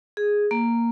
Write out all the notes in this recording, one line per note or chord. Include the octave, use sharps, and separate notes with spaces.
G#4
A#3